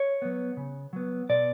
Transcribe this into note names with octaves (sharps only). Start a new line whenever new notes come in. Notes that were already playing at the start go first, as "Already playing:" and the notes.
Already playing: C#5
F#3 B3
C#3
F#3 B3
B2 D5